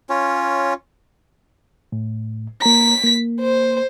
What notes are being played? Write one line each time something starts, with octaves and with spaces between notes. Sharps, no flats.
C#4 F4 C#5
A2
A#3 A#5 B6
A#3
C5